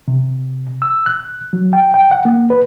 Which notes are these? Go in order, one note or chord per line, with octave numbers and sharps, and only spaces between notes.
C3
E6
F#6
F#3
G5
G5
F#5
A#3
B4